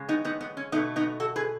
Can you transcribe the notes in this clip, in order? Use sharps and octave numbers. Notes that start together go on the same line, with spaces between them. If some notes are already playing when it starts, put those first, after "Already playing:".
Already playing: C#3 G#3
B3 D#4
B3 D#4
B3
C#4
B2 A3 B3 D#4
B3 D#4
F#4 A4
G#4 B4